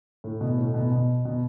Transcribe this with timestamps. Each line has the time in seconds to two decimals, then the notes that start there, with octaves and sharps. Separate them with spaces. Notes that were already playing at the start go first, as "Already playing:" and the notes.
0.24 A2
0.41 B2
0.58 A2
0.74 B2
0.92 B2
1.25 B2